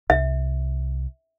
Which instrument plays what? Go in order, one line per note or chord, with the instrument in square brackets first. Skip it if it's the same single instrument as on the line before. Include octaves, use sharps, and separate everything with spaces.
[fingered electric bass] C2 [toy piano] E5